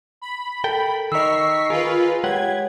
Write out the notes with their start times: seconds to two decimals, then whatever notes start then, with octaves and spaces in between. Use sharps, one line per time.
0.22 B5
0.64 A4 A#4 G5
1.12 D#3 A#4 D#5 C#6 E6 B6 C7
1.70 F4 G#4 A#4 B4
2.24 G#3 G4 C#5 F#5 G#6